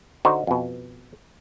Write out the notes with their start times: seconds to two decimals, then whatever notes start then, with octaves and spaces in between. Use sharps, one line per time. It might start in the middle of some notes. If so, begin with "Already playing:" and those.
0.25 D3 D#4 F#4 C5
0.47 F2 B2